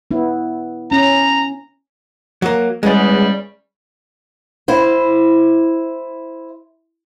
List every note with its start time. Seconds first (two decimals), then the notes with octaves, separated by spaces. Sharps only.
0.11 B3 E4
0.91 C#4 A#5
2.42 F#3 A#3
2.83 E2 C#3 G3 G#3 B3
4.68 E4 C5